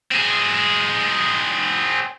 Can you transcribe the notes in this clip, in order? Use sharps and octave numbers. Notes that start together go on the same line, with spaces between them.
C4 G#4